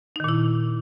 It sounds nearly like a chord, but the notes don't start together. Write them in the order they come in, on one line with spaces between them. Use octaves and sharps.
D#4 D#3 A#2 E4